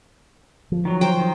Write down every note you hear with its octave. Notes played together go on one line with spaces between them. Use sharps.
F3
D#3 F#3
C5 G5
D#3